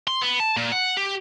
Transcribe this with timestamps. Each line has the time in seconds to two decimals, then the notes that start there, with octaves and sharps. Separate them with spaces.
0.08 C6
0.22 B3
0.40 A5
0.57 A#2
0.72 F#5
0.97 G4